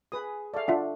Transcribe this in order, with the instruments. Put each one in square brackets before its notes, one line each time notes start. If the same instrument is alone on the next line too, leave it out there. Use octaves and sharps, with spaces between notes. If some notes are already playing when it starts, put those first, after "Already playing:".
[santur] G#4 G#5 [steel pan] B4 D#6
[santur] A3 [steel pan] D5 F5
[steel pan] D4 [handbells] F4 E5 F#5